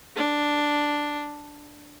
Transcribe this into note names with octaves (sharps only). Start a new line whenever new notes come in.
D4